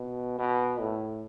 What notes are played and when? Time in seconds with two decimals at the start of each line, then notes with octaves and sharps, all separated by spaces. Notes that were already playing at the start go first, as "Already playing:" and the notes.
Already playing: B2
0.39 B2
0.80 A2